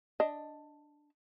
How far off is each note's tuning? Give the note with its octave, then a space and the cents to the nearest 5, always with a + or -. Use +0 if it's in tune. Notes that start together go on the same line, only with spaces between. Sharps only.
D4 +5 D#5 +0